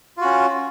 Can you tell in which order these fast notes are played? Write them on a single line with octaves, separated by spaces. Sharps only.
F4 F#4 C#4